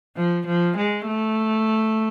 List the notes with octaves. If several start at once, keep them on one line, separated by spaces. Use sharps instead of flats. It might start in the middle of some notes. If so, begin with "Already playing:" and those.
F3
F3
G#3
A3